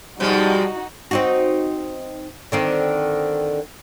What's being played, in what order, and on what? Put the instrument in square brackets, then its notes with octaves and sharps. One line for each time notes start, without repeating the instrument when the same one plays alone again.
[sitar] B2 F3 G#3 [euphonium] G3 [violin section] D#4 F#4
[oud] C4 D#4 F#4
D3 D#3 C4